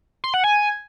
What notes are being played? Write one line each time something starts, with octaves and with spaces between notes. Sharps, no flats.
C6
F#5
G#5